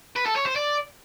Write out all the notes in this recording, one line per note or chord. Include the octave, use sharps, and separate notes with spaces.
B4
A4
C#5
C5
D5